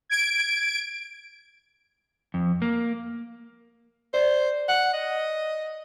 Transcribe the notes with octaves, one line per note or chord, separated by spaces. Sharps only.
G#6 D7
F2
A#3
C5 D5
F#5
D#5